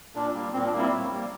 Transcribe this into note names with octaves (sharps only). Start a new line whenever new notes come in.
A#2 D4
G3 A#3
A#2 C4
D4
G3 A#3
C4 E4
A2
G3 A#3